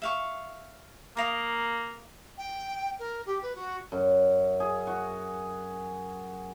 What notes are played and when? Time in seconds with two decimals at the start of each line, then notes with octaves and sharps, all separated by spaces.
0.02 E5 F5 C#6
1.17 A#3 A#4 F5 D#6
2.37 G5
2.99 A#4
3.26 G4
3.42 B4
3.55 F#4
3.92 F#2
4.60 G#4
4.87 F#4